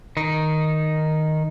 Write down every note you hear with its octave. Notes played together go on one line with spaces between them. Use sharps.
D#3 D#4